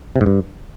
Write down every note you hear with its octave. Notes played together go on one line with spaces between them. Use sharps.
C3
G#2
G2